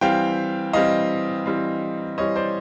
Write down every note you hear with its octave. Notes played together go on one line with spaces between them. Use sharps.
E3 G3 C4 F5 G5
E3 G3 C4 D#5 F5
E3 G3 C4
E3 G3 C4 C#5 D#5
C5 D5